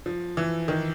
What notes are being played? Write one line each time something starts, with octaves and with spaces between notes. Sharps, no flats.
F3
E3
D#3